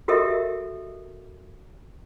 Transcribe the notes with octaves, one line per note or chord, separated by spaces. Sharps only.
F#4 G4 A4 A#4 D#5 E5